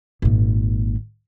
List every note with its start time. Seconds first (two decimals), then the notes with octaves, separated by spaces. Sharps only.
0.22 G#1 A#2